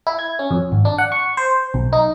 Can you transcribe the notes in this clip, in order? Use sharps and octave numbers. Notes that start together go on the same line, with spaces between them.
E4
G#6
C#4
F2
G#1
D4
F#5
C#6
C5
B1
D#4